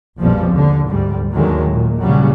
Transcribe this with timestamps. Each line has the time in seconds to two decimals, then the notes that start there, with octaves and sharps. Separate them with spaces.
0.19 A#1 F2 B2 F3 G3
0.50 D#2 D3
0.87 D2 G#2 G3
1.32 D#2 D3 D#3 F#3 G#3 A3
1.70 A#2
2.02 A#1 A2 C#3 F#3 G3